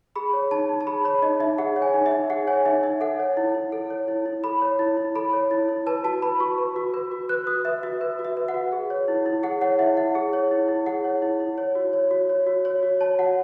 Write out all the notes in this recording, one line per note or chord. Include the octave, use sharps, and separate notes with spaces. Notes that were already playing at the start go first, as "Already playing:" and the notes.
G#4 B5
C#5
D#4 A5
D#4
A5
G#4 B5
C#5 B5
D#4 D#5
D#4 E5
G#4 F#5
C#5
G#5
D#4
E5
D#4
G#4 F#5
C#5 G#5
D#4 E5
D#4 E5
A4 F#5
C#5
E4
E4
A4
C#5
E4
E4
A4 B5
C#5
E4
E4
A4 B5
C#5
E4
E4
B4 A5
F#4 A5
B4 B5
F#4 C#6
B4
F#4
B4
F#4
B4 F#6
F#4 D#6
B4 E5
F#4 E5
B4
F#4
E5
B4
F#5
F#4
G#4
C#5
E4
E4
G#4 F#5
C#5 F#5
E4 E5
E4 F#5
G#4
C#5
E4
E4
G#4 F#5
C#5
E4
E4
C#5
F#4
C#5
F#4
C#5
F#4
C#5
F#4
C#5 A5
F#4 F#5